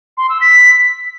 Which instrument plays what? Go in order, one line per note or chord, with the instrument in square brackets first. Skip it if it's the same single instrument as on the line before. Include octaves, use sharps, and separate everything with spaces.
[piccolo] C6
E6
B6